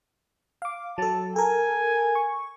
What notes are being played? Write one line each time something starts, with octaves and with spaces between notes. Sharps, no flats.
F5 D6
F#3 A4 A5
A4 A#4 G#5
C#6